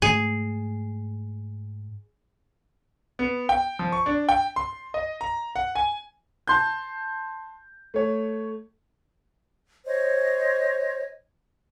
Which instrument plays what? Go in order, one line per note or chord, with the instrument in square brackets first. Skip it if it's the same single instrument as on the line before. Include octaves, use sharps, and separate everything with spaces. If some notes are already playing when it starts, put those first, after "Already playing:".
[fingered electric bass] G#2 A3 [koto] G#4
[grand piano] B3
G5
F3
C#6
D4
G5
C6
D#5
A#5
F#5
G#5
A5 C6 G6
A3 C#5
[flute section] C5 C#5 D#5